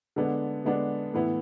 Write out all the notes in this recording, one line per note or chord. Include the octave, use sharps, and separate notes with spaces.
D3 G#3 B3 D4
D3 G#3 B3 D4
A2 E3 B3 E4